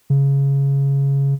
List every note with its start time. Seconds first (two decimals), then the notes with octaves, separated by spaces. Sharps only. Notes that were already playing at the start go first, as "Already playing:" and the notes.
0.10 C#3